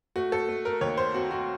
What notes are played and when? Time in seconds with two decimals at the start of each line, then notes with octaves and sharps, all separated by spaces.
0.16 A3 F#4
0.32 A4
0.49 A3
0.65 A#4
0.81 D#2 C#5
0.97 C5
1.14 C4 F#4
1.31 F#4